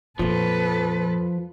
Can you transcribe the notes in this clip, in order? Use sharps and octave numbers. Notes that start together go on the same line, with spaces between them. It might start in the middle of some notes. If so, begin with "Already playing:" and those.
F2 A#2 F3 A4 B4